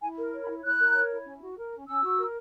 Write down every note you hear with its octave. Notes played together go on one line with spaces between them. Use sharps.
E4 G#5
A#4
C#5
B5
E4
E4 F#6
A#4
C#5
E4
C#4
F#4
A#4
C#4
C#4 E6
F#4
A#4